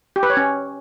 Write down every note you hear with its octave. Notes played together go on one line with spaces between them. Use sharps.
G4
B4
C#5
C#4